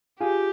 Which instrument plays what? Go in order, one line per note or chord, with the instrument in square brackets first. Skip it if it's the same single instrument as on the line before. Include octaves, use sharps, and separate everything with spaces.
[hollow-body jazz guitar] F4 G#4 [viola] G4